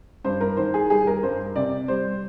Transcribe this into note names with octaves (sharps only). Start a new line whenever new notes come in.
G2 C5
A#4
D#3 C5
G#4
G3 G#4
A#4
G2 C5
C3 D5
G3 C5